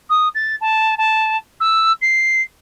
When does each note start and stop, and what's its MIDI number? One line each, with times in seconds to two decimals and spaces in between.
0.10 0.28 87
0.35 0.56 93
0.61 0.95 81
0.98 1.37 81
1.60 1.93 88
2.02 2.42 96